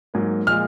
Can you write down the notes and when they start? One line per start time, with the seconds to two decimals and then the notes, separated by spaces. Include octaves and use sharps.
0.14 G#2 F#3 A#3
0.46 A#2 F3 G#3 F6